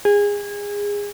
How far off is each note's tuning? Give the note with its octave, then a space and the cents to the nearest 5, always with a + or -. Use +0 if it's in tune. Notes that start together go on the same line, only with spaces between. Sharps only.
G#4 -25